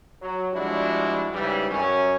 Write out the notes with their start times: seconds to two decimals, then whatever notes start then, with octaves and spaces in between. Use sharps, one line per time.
0.22 F#3
0.53 F3 G3 G#3 D4 E4 F#4
1.33 G#2 C#3 E3 G3
1.71 F#2 C#4